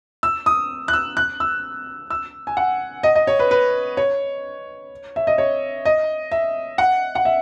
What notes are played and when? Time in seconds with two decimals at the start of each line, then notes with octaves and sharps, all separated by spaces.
0.23 E6
0.46 D#6
0.88 F#6
0.93 E6
1.17 F#6
1.40 E6
2.10 E6
2.47 G#5
2.57 F#5
3.03 D#5
3.15 D#5
3.27 C#5
3.39 B4
3.51 B4
3.97 C#5
5.16 E5
5.27 D#5
5.38 C#5
5.85 D#5
6.31 E5
6.78 F#5
7.15 F#5
7.25 E5